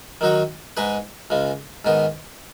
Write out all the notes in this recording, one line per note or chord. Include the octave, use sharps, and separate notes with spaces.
D#3 F#3 D#4 F#4
G#2 G#3 D#4 G#4 B4
C#2 C#3 G#3
G#2 D#3 B3 D#4